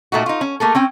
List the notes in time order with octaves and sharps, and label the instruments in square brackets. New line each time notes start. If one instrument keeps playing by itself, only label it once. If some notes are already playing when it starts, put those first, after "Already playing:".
[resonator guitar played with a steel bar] A#2 A3 D#4 F#4
D#4 F4
C#4
A3 A#3 G#4 A4
C4 C#4 G5